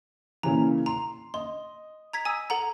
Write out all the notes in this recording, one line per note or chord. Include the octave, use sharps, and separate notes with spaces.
A#2 C#3 E3 A#5
A#5 C6
D#5 C6
A#5 G#6 B6
G#5 D#6 E6
A4 F#5 A#5